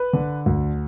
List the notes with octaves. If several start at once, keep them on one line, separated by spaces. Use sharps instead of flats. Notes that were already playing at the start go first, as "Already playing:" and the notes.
Already playing: B4
D3
D2